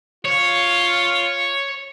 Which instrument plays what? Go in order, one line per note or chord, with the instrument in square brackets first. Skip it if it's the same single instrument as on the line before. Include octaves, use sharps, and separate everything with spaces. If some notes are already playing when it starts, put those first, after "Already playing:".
[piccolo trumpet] F4 [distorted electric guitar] C#5